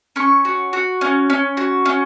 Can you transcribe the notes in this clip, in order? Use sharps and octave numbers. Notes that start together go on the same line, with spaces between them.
C#4 C#6
F#4
F#4
C#4
C#4
F#4
C#4